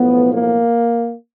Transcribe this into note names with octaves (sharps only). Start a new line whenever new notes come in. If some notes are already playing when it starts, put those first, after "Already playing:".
Already playing: B1 A2 F3 B3
A#3